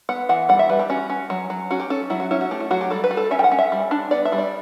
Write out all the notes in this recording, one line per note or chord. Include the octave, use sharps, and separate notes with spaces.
B3 F#5
E3 F#5
G3 F#5
E5
G3 B4
G4
C#4 F#4
C#4
F#3
F#3
C#4 F#4
G4
C#4 A4
F#3 E4
F#4
C#4 E4
F#4
A3 G4
E4
F#3 F#4
G4
G3 A4
B4
G3
A4
C#4 E5
G5
F#5
C#4
E5
G3
D4
B3 D5
E5
G3
D5